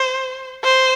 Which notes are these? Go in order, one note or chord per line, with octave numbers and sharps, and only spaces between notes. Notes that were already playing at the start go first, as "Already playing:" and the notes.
Already playing: C5
C5